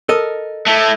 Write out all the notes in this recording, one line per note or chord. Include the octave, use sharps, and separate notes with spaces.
A4 A#4 D#5
A3 E4